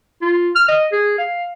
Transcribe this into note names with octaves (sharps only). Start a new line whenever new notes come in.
F4
F6
D#5
G#4
F5